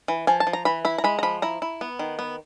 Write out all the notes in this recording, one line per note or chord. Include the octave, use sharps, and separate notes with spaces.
E3
F3 G#5
A5
F3
A#5
E3 B5
E4 B5
A#5
G#3 B5
A#5
F3 B5
E4 A#5
E4
B3
D#3
B3